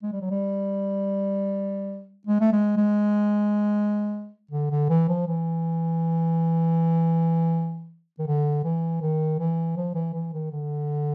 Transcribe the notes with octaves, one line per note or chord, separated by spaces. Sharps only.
G#3
G3
F#3
G3
G#3
A3
G#3
G#3
D3
D3
E3
F3
E3
D#3
D3
E3
D#3
E3
F3
E3
E3
D#3
D3